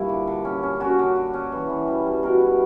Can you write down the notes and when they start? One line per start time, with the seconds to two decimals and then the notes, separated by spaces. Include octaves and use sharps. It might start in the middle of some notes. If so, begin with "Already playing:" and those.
Already playing: G2 A#2 E4 F#4
0.09 D3
0.27 D3
0.45 C#4
0.63 C#4
0.80 C#4 F#4 A#4
0.99 D3
1.16 D3
1.33 C#4
1.52 E3
1.69 E3
1.88 G3
2.06 G3
2.23 B2 F#4 A#4
2.41 E4